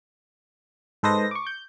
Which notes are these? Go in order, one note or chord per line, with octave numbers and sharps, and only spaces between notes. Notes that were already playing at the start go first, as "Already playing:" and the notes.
G#2 A4 B4 C5 D#5 A#6
C#6 D6
G6